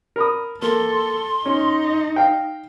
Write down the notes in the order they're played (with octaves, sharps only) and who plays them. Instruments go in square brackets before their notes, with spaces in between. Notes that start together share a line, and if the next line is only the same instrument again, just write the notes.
[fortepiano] A#4 B5 D#6
[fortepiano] A#3 [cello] A4 [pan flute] C6
[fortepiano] C#4 [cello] D#4
[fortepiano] F5 G5